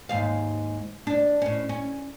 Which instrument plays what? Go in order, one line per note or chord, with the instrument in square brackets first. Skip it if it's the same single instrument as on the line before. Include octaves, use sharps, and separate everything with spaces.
[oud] D#2 G#2 F5
D4
A2 C#4
C#4